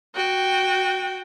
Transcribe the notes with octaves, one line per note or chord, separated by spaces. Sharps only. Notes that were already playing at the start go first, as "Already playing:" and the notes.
F#4 G5